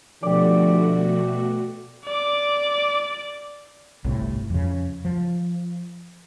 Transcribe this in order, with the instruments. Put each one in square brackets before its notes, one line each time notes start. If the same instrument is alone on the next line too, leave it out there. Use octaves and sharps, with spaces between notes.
[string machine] B2 A3 F#4 [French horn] D3 [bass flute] F3 [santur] G4 D5
[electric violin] D5 D6
[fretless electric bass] G1 C2 A2
F2 C#3
F3